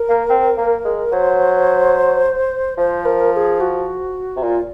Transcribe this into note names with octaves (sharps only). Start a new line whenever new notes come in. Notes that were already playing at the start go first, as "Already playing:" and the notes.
Already playing: A#4
A#3
C4
A#3
G#3
F#3 C5
F3 C5
A#4
A#4
G#4
F#4
C3
A#2 F4